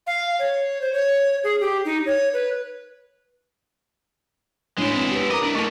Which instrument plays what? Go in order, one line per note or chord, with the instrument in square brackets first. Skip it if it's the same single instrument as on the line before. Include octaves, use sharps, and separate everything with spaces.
[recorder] F5
C#5
C5
C#5
G#4
G4
D#4
C#5
B4
[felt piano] A1 [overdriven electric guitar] G#3 E4 [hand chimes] D4 C#5
[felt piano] B3 C4
G4 B4
[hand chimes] A#4 [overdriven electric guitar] D#5 [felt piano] A#5 D6
[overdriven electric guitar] D4 E4
[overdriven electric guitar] A3 A#3 [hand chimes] D#5 A5 [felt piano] C#6